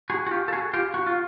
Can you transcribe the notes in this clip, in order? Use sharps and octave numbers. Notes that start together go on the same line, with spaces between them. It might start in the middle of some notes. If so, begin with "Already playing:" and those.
F#4 G#4
F#4
F4 G4
A4
F#4 G#4
F4 G4
F#4
F4